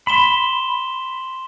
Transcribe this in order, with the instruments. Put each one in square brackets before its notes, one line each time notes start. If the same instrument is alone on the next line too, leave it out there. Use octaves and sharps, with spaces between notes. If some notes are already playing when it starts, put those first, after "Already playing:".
[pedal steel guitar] B5 [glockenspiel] C6 E7 G7